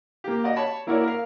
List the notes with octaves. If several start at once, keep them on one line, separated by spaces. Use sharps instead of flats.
A#3 G4
F#4 D5 D#5
C#5 A5 B5
A#3 E4 F#4 A#4 C#5 D5
A#4 F5